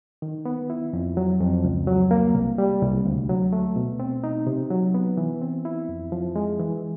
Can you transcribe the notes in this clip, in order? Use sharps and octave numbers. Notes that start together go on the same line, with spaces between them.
D#3
B3
E4
F2
F#3
F2
C#2
F#3
A#3
C2
G3
C2
D2
F#3
A3
B2
C4
D#4
C3
F#3
B3
E3
C4
E4
F2
F3
G#3
E3